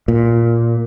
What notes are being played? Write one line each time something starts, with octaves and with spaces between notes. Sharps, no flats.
A#2